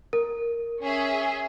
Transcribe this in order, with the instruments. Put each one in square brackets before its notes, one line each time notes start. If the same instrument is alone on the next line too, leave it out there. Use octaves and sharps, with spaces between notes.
[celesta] A#4
[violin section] C#4 G#4 E5